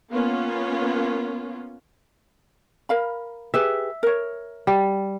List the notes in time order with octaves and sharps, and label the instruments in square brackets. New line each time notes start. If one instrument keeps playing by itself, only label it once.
[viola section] A#3 B3 C#4 F4
[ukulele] A#4 F5 B5
[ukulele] G4 G#4 B4 [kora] E5
[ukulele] A#4 C#5
[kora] G3